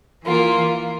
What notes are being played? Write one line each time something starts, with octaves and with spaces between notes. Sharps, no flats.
E3 A#3 F4